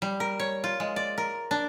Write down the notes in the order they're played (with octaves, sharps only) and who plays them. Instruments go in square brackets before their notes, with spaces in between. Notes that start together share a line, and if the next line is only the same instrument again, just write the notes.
[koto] G3
A#4
C#5
F4
G#3
D5
A#4
D4